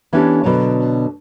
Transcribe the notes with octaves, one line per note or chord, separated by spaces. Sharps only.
E3 B3 C#4 D4 G4 A4
B2 D3 F#3 C#5 D5